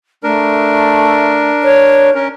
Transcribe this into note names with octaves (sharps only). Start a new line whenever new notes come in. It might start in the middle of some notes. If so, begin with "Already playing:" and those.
A3 D4 A#4
C#5
C#4 A#4